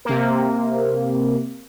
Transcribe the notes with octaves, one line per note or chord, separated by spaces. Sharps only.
C3 A#3